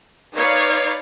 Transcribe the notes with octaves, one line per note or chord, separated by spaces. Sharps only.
D#4 B4 C#5 D5 F5